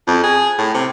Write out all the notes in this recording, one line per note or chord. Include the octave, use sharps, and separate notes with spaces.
F2
G#4
A2
C3